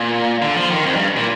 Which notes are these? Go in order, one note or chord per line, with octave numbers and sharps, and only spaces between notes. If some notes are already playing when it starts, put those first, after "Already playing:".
Already playing: A#2
D3
F3
D#3
F2
G2
A#2